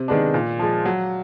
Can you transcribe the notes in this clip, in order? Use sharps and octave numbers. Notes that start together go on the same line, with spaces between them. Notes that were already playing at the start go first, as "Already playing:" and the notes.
Already playing: C3
D#3 G#3 B3 D4
A#2
F3 G#3
F#3